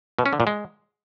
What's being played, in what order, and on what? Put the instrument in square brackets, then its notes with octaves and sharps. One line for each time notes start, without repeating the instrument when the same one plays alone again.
[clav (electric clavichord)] B2
C#4
D3
A#2
G#3